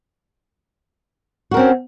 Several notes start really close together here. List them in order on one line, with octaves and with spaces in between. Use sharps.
F#4 A#4 C4 C#4